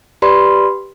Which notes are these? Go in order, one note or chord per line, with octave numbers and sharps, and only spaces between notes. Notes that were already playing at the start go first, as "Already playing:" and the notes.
G4 B4 D5 B5 C6